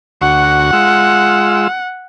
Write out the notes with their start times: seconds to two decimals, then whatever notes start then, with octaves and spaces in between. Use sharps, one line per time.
0.22 D2 F#4 F#5 C#6
0.73 G#3 F4 E6